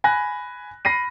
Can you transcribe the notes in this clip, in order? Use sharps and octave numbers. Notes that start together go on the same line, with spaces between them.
G#5 B5 F#6 A#6
B5 A#6 C7 D#7